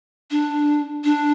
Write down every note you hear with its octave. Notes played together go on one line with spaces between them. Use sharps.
D4
D4